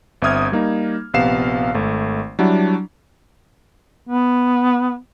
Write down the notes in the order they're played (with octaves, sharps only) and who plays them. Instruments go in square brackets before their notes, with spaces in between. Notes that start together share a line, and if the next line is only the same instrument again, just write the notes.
[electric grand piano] G1 C4 E5 D#6 F6 G#6
G3 A#3 D#4
A#1 C3 B3 F5 C7 E7
G#1 A3
F#3 G3 D4 E4 F#4
[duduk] B3